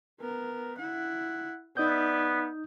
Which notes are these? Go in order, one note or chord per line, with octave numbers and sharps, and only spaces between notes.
B3 A#4
E4 F#5
B3 D#4 D5 E5 D#6 G6